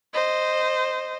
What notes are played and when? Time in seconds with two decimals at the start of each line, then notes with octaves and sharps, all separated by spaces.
0.14 C5 D#5